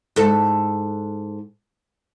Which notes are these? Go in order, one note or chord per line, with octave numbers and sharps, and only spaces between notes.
G#2 A4